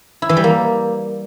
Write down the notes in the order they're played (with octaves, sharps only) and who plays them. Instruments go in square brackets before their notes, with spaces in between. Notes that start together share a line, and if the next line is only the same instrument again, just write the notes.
[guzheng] E4
E3
G3
A#3